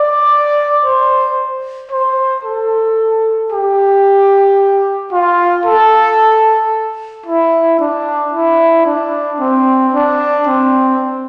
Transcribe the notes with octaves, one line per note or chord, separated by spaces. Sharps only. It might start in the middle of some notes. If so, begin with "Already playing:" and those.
Already playing: D5
C5
C5
A4
G4
F4
A4
E4
D4
E4
D4
C4
D4
C4